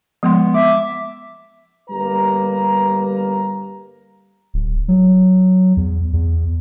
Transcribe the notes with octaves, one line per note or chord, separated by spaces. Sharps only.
F3 G#3 B3 C6
E5 D6
G1 G3 A#3 B4 A#5
D1
F#3
E2
E2